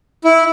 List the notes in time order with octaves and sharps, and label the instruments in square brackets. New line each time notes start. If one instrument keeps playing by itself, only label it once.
[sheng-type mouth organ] E4